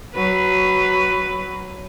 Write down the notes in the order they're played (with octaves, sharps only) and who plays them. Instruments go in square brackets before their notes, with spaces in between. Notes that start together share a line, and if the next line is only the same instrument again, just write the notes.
[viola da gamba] F#3 B4